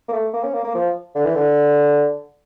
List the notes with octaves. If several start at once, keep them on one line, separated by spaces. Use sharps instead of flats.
A#3
A3
A#3
C#4
A#3
A#3
F3
D3
E3
D3